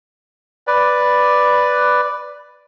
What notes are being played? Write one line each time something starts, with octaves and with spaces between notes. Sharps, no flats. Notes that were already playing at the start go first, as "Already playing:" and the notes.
B4 D5